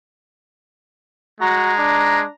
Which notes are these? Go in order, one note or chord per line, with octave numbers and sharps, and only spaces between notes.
G#3 F#4 A#5
D4